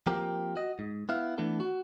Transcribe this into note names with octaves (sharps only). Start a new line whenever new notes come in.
F3 A#3 C4 G4 A#4
F#4 D#5
G#2
B3 E4 F5
E3 A3 B3 D4 A4
F#4